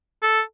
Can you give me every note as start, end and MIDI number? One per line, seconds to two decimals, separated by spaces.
0.22 0.41 69